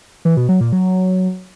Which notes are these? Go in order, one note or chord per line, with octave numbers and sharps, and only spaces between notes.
E3
B2
F#3
A#2
F#3